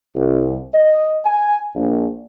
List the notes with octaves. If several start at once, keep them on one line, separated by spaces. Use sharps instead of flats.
C2
D#5
G#5
A#1